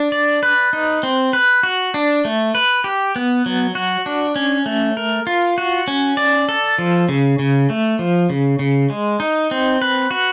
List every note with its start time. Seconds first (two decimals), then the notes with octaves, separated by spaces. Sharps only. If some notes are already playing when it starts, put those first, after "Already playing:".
Already playing: D4
0.12 D5
0.43 B4
0.73 D#4
1.03 C4
1.33 B4
1.63 F#4
1.94 D4
2.25 A3
2.55 B4
2.84 G4
3.16 B3
3.46 F#3
3.75 F#4
4.06 D4
4.36 C#4
4.66 A3
4.97 A#4
5.27 F4
5.58 F#4
5.88 C#4
6.17 D5
6.49 A4
6.78 F3
7.09 C#3
7.39 C#3
7.70 A3
7.99 F3
8.30 C#3
8.59 C#3
8.90 G#3
9.20 D#4
9.51 C4
9.82 B4
10.11 F#4